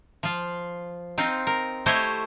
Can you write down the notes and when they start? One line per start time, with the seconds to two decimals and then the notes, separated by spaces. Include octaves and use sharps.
0.23 F3 F4
1.18 C4 D#4 F4
1.47 A#4
1.86 A3 E4 G4 C5 C#5 D#5